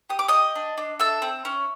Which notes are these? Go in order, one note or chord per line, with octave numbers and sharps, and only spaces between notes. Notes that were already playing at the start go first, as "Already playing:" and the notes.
G4 D#6
D6
G4 D#5 D#6
D4
D4
A4 E5 E6
C4
C#4